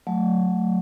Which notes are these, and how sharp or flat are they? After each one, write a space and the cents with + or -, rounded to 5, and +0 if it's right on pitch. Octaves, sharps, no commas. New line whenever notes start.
F#3 -15 A3 +0